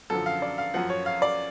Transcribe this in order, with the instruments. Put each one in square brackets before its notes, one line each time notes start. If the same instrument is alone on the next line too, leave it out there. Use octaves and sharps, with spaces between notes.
[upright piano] F#2 D3 F3 A4
F5
D5
F5
F#2 F3 F#5
C#5
F5
D5